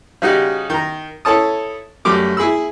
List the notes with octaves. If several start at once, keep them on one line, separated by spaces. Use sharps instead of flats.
C#3 G3 D#4 F#4 G4
D#3 A#5
E4 A4 C#5 A5 D#6
F#2 G3 A3 D6
E4 G#4 B5 E6